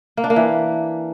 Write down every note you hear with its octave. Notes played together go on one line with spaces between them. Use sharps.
A#3
D4
A#3
E3